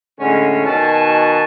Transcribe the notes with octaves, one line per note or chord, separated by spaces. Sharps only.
A2 D3 G#3 C#4
B2 D#3 D#4 F#4 G#5 A5